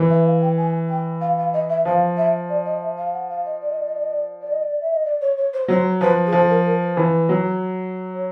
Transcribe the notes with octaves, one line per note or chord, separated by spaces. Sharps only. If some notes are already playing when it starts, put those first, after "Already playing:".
Already playing: E3
E5
F5
G5
G#5
G5
F5
F5
D#5
E5
F3 F5
E5
D5
D#5
E5
F5
F#5
F5
D#5
D5
D#5
D5
D#5
D5
D#5
D5
D5
D#5
D5
E5
D#5
D5
C#5
C#5
C5
F#3 C5
F3 B4
G#4
F3 A4
A#4
A#4
B4
E3
F#3
C#5